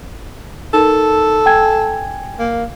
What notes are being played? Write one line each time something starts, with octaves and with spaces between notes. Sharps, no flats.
D#4 A4 A#4
G5 G#5 G#6
A#3